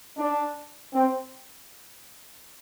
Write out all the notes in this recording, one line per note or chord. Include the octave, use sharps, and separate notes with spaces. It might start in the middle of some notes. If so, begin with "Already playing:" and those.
D4
C4